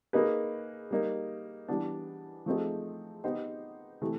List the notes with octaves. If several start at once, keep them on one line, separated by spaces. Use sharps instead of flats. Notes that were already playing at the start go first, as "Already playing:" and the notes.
A#3 D#4 G#4 B4
G3 A#3 D#4
E3 G3 B3 D4
F3 A3 C4 D#4 G#4
B3 D#4 G4 C5
C3 E3 A3